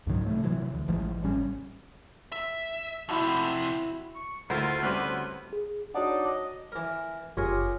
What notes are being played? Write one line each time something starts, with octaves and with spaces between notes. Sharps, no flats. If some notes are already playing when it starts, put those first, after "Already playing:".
C#2 G#2 D#3 F#3
C3 A3
C3 E3 F#3
D2
A1 E3 F3 G#3
A1 C#3 G3 C#4
E5 E6
F2 C3 E4 F#4 A5
C#6
D2 E4 F4 A#4 C5
G3 C4 C#4 B4
G#4
D4 D#4 F#4 C#5 D5 F#5
D#5
E3 A#4
F#1 F4 G4 G#4 A#4 C#5